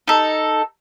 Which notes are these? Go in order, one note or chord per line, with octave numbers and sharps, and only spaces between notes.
D#4 A4